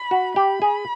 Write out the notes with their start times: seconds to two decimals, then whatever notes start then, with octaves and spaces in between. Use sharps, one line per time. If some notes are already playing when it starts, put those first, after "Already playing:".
Already playing: B5
0.11 F#4
0.36 G4 B5
0.62 G#4